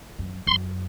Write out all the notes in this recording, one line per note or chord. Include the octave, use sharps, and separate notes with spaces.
F#2
F#2 C6